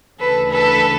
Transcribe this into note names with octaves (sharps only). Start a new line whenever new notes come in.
D2 C#3 E3 A4 B4
A4 B4